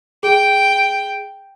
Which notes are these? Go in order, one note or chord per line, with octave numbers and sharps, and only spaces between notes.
G#4 G5